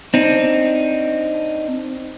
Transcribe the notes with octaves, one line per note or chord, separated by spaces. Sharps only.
C4 D4 D#4